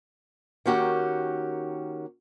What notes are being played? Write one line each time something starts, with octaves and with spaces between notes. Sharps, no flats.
D#3 A#3 C#4 F#4 G4